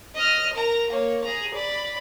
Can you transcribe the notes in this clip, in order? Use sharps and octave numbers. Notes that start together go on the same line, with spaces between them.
D#5 F6
A#4 A#5
A#3 C#5
G#4 A#5
D5 B5